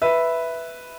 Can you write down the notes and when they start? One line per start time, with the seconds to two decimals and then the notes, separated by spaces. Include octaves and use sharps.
0.02 B4 E5